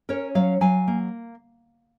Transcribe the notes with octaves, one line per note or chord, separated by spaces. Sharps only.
C#4 A#4 C#5
F#3 C#5 F5
F#3 F5 G#5
A#3